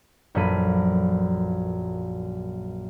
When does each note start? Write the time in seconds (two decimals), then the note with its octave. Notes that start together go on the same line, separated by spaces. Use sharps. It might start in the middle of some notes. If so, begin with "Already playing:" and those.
0.35 A#1 F#2 F3 A4 B5 D#7